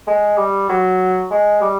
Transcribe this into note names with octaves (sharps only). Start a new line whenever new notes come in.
G#3
G3
F#3
G#3
G3